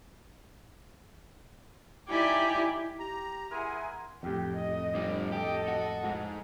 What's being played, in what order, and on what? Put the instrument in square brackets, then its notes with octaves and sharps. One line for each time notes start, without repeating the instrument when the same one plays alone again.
[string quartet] D#4 E4 G4 D5 G5 G#5
[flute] G4 [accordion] A#5
[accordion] E4 G#4 G#5 [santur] A#4 F#5 [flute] C6
[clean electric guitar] F2 A2 [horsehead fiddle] G4
[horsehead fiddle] D#5
[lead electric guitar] D3 G3
[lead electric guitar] G4 [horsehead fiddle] A4 D#5
[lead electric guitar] F#4
G#2